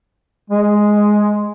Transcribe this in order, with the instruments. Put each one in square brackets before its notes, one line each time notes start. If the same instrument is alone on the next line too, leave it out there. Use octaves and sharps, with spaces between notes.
[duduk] G#3